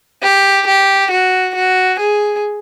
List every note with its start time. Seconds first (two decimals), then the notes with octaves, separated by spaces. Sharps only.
0.22 G4
0.67 G4
1.11 F#4
1.55 F#4
1.99 G#4